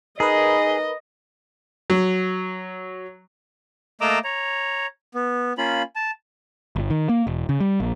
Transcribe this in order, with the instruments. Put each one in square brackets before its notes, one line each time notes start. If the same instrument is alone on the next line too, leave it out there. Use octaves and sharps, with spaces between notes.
[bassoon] D#4 [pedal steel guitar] G#4 [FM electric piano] A#4 B4 [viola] D#5
[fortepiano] F#3
[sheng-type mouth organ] A3 A#3 D#5 A#5 D6 E6
C#5 A#5
B3
A#3 C#4 F4 B5
A5
[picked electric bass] G1
D#3
A#3
E1
C#3
G3
A#1